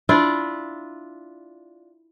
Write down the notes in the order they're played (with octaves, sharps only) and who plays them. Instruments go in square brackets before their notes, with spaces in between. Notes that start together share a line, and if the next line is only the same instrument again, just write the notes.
[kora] D4 E4 F4 D5